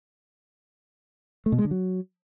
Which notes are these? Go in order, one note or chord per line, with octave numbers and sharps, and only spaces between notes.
A3
B2
G#3
D3
F#3